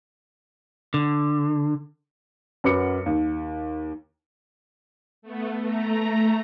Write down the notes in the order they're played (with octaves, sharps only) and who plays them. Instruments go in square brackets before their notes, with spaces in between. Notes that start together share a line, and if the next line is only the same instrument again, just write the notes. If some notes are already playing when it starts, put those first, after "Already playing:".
[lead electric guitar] D3
[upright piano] F#2 F#3 B4 D6 C#7
D#2
[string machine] A3 B3
A3 A#5